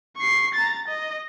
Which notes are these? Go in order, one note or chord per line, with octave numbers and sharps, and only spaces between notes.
C#6 C7
A#5 A6
D#5